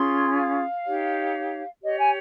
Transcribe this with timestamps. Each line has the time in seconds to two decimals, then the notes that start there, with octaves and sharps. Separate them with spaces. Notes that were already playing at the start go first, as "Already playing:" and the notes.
Already playing: C#4 F4 G#4 C6
0.36 F5
0.84 D#4 G4 C#5
1.82 G4 C#5 D#5
1.98 G#5